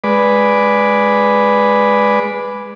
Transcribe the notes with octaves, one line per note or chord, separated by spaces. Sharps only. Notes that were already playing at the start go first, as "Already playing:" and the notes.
G#3 B4 D5